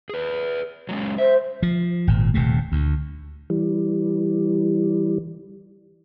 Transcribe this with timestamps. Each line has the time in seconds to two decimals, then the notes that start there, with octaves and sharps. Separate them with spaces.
0.09 G#4 B4
0.89 F#3 G#3 C#4
1.18 C5 E5
1.63 F3
2.07 G#1 A#2
2.34 D#1 D#2 C3 A3
2.72 D2
3.50 E3 G3